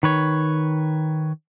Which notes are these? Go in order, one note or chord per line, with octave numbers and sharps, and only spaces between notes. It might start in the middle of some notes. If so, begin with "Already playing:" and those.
D#3 B4 C#5